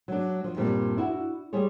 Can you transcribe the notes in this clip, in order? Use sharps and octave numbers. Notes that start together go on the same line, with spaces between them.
F#3 D4
F3
G2 A#2 G3 C4 D4
D4 E4 F#4
G3 G4 G#4 C5 C#5